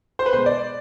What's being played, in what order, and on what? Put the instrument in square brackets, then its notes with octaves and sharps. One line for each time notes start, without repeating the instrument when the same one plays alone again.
[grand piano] C5
B4
B2 G#3 C5
D5